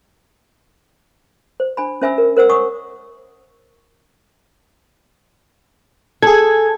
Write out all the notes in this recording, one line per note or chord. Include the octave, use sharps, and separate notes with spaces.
C5
D4 G#5 B5
C#4 C5 E5 G#5 B5 E6
A#4
A#4 C5 F#5 E6
C#5 F#5 G#5 C#6 D#6
G#4 A4 G#6